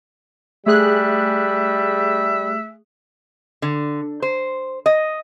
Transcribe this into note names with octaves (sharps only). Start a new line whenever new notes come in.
G3 A3 G#4 E5 F#6
D3
C5
D#5